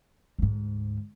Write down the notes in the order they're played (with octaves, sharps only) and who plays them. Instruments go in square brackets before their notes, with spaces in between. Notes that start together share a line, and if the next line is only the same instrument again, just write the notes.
[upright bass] D2 G#2